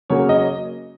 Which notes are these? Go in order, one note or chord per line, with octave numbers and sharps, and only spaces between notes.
C#3 F#3 A#3 C#5
D#5